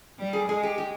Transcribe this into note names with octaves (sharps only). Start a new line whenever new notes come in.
G3
G#4
G#3 G#4
G4
G4